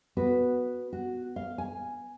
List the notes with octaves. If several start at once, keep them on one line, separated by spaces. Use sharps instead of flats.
B3 F#4 B4
F#4
F5
G#5